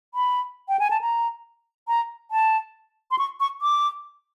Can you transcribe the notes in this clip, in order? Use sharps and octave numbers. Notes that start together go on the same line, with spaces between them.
B5
G5
G#5
A5
A#5
A#5
A5
C6
C#6
C#6
D6